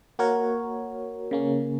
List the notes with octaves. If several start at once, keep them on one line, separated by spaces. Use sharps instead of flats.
A#3 F#4 A#4 C#5
C#3 A#3 C#4